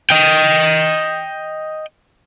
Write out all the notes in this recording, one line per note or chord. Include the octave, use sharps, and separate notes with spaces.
D#5 G5